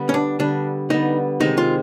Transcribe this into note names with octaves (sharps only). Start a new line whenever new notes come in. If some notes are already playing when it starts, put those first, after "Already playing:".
Already playing: D3 G3 B3
C#4
D4
D3 G3 B3 D4
D3 G3 B3 D#4
C3 D#3 G#3 C4 D#4
F4